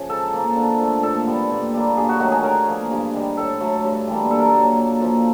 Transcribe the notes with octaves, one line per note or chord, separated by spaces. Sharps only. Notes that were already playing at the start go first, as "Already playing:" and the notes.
Already playing: C#3 F3
G#2 A4
F3 A#3
D3
F3 A3
A#2 A4
G3 B3
A#2
G3 A#3
G2 G#4
F#4
D#3 F#3 A3 F#4
G#4
D3 A#4
F3 A#3
G2
D#3 G3
A2 A4
F#3 A3
G2
E3 G3 A#3
D3 A4
A#4
A4
F#3 A#3
A#2
F3 A#3